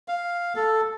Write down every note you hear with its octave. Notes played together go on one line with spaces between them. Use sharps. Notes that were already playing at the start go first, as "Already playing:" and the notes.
F5
A4